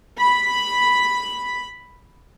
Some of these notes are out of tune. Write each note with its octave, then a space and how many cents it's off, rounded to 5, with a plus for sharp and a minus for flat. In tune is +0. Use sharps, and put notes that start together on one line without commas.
B5 +0